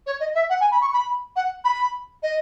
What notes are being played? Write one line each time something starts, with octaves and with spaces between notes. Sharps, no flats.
C#5
D#5
E5
F#5
G#5
B5
C#6
B5
F#5
B5
D#5